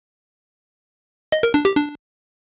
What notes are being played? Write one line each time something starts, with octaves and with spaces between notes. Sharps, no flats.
D#5
A#4
D4
G4
D4